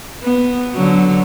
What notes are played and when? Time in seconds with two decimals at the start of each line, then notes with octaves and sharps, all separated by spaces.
0.23 B3
0.75 D3 F#3